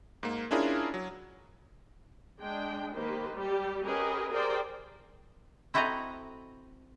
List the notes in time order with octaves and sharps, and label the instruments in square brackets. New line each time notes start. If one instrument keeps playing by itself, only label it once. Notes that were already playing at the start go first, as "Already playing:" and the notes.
[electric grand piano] G#2 A#3
C#4 D4 E4 F4 G#4 A#4
F#3
[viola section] G#3 D4 G5
D#3 A#3 G4 B4 C5
G3 G4
C#4 G4 G#4 A#4 B4 D#5
G4 G#4 A#4 C5 D5 G5
[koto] C4 E4 F#4 A4 D#5 A#5